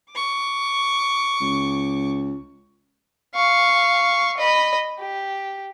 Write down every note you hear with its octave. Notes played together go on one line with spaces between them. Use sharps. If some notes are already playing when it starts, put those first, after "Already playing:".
C#6 D6
C#2
F5 C#6
D#5 B5
G4